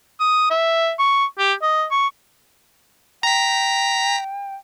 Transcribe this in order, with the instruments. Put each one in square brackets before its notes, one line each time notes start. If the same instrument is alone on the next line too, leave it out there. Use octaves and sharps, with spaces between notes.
[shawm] D#6
E5
C#6
G4
D#5
C#6
[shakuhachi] G5 [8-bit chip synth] A#5 B6